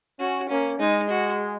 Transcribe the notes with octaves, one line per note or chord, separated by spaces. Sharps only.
C#4 F#4
A#3 C#4
G#3 D#4
F#4